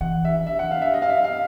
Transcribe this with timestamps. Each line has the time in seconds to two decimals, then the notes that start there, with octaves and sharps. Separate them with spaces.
0.01 E3 F#5
0.25 E5
0.47 E5
0.59 F#5
0.71 F5
0.82 E5
0.94 D#5
1.02 F5
1.09 E5
1.24 F5